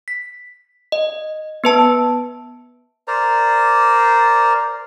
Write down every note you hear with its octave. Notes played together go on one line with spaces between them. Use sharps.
B6
D#5
B3 B4 A5
A#4 C5 D5 A#5